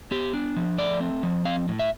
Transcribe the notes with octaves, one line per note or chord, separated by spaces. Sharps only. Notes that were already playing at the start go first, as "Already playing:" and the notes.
B3 G4
D4
F3
A3 D5
C4
F3
C4 F5
A2
E5